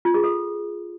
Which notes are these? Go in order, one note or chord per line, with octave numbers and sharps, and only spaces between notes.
F4
G#4
A4